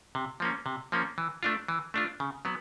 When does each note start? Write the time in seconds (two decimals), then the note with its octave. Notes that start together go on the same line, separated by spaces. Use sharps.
0.15 C3
0.40 F3 A#3 C#4
0.66 C3
0.92 F3 A#3 C#4
1.18 E3
1.43 A3 D4 F4
1.68 E3
1.94 A3 D4 F4
2.20 C#3
2.45 F#3 B3